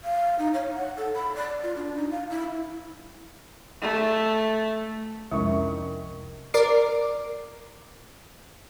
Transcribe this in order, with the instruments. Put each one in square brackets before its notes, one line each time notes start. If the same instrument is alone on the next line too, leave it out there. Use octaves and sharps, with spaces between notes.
[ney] F5
D#4
C#5
F#5
A4
B5
D5
F4
D4
D#4
F5
E4
[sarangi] A3
[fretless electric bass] C2 F2 [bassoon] D#3 [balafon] G#3 [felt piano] C#4 E4 C#6
[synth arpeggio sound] A#4 D5 D6 C7